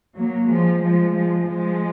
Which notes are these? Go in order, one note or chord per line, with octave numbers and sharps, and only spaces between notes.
F#3 A#3
F3 G#3
F3 G#3
F3 G#3
F3 G#3